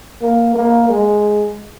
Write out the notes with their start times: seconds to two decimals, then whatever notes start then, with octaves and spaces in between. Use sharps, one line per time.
0.22 A#3
0.55 A#3
0.89 G#3